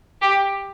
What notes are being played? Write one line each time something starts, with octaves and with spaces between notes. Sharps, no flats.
G4